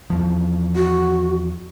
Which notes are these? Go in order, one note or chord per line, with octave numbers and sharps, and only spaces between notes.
E2 F3
F#4